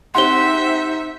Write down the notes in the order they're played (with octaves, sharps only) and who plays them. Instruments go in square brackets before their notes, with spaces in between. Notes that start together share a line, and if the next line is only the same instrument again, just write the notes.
[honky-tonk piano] C4 G4 F#5 [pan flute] D#4 [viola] E5 [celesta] C6 G7